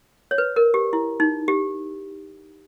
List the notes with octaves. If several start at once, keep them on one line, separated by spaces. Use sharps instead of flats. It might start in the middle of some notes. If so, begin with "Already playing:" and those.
C#5
B4
A#4
G4
E4
D#4
G4